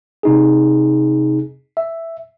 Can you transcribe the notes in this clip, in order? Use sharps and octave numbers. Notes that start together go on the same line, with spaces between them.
C3 D#4 G#4
E5